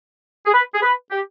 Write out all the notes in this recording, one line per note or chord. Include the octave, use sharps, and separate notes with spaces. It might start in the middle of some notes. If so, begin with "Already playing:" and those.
G#4
B4
G#4
B4
G4